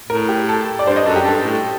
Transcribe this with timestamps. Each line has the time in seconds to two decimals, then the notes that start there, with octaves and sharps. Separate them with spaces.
0.09 A2 A#4
0.29 G4
0.49 A4
0.79 D5
0.87 G2 C5
0.96 D#5
1.06 F#2 A4
1.16 G4
1.25 G2 A4
1.44 A2